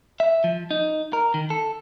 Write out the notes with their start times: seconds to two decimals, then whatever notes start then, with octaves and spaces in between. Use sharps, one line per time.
0.20 E5
0.44 F3
0.71 D#4
1.13 A#4
1.34 D#3
1.50 A4